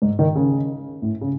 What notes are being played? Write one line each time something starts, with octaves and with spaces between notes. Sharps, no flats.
G#2
D#3
C#3
A2
C#3